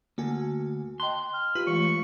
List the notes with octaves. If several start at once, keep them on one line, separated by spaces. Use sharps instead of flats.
D2 A#3 F#4 G#5
D#5 G5 A5 C6 F#6
F6
F4 G4 B4
E3 G#3 A3 C#6